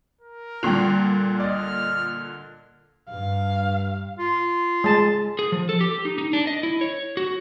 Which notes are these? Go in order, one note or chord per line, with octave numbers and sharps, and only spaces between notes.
A#4
A#2 D3 G3 F4 G5 F#6 F7
D5 D#5 F6
G2 F5
F4
G#3 A5
G#4
F3
A4
G4
D#4
D#4
D4
D#5
E4
C#5
F#4